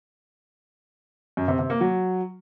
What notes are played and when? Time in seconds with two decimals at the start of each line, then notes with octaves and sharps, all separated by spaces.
1.37 F#2
1.48 C3
1.59 C3
1.70 A#3
1.81 F#3